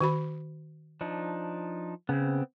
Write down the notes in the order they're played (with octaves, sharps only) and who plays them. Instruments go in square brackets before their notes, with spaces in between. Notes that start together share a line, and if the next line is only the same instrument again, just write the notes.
[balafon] D#3 F#4 B5
[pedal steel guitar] F3 D4 D#4
[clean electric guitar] C#3 [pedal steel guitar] B3 C4